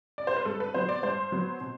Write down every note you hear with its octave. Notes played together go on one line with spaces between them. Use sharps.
D5
C5
B4
G2 A4
B4
F#3 B3 C5
D5
G2 C5
F#3 B3
B2